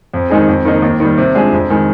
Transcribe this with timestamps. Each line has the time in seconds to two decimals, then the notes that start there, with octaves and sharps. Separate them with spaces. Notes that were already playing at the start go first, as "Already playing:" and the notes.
0.14 F2
0.30 D#3 G#3 D#4 G#4
0.48 F2
0.65 D#3 A#3 D#4
0.82 D#2
1.00 D#3 G3
1.18 C3
1.35 F3 G#3 D4 G#4
1.52 F2
1.70 D#3 G#3